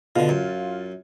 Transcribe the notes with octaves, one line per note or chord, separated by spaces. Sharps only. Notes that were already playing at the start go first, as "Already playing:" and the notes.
B2 D3 F4
F#2